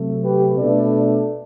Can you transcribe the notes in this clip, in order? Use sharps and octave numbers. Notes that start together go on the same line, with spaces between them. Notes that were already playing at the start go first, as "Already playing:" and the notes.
Already playing: C3 F#3 A3
G4 B4
B2 A3 D4 B4 D5